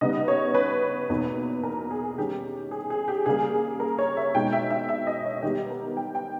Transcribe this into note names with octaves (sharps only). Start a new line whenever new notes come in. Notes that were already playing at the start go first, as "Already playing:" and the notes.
C#3 G3 B3 D#4 D#5
C#5
B4
E2 B2 A#3 D#4
A#4
G#4
D#3 G3 C#4 G4
G#4
G#4
G4
C#3 G3 A#3 G#4
A#4
C#5
E5
B2 G#3 D#4 G5
E5
E5
E5
D#5
C#5
D#3 G3 B3 G4
A#4
G5
G5